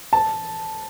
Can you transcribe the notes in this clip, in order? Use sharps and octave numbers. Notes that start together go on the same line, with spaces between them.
A5